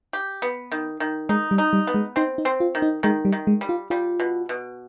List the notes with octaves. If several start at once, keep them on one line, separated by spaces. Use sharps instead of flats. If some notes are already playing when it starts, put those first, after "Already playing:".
G4
B3
D#3
D#3
G#3 D#4
G3
D#4
G3
B3
G#3
C4 D#4
D#4
C4
F4
D#3
D#4
D#3 G#3
G3
D#3
G#3
G3
F4
G3 F4
B2
B2